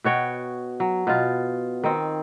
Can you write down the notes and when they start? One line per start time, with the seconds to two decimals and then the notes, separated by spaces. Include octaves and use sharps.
0.04 B2 F#4 C#5 G5
0.80 F#3
1.07 B2 F4
1.84 D#3 C4